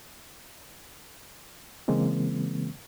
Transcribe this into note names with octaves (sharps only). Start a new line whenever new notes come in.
C#3 E3 G#3 A#3 C4